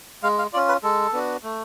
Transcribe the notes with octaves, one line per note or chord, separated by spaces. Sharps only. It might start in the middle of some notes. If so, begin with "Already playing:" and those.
G#3 F5
F5
C#4 F4 D5
B4
G#3 A4
B3 D4 F#4
A3